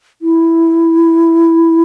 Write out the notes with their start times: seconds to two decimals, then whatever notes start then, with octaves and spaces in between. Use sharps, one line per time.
0.22 E4